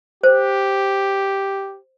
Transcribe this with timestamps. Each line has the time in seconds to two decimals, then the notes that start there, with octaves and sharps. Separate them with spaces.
0.23 G4 C5